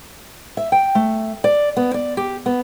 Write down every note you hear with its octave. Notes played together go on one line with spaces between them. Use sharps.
E5
G5
A3
D5
B3
D5
G4
B3